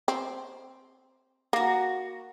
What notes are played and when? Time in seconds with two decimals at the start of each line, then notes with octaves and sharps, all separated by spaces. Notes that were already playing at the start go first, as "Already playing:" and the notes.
0.08 C4
1.53 A#3 F#4 A#5